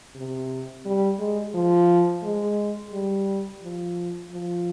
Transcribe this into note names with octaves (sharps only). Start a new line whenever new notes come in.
C3
G3
G#3
F3
G#3
G3
F3
F3